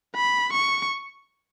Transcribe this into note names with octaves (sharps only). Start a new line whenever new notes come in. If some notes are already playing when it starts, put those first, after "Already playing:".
B5
C#6